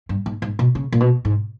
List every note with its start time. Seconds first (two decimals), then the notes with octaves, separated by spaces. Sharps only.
0.09 G2
0.26 G#2
0.42 G#2
0.59 B2
0.75 C#3
0.92 A#2
1.00 B2
1.25 G#2